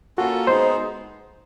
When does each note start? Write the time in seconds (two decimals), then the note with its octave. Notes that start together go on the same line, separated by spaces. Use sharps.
0.17 A#3 C#4 F4 F#4 A4
0.47 G#3 B3 D#4 G#4 C5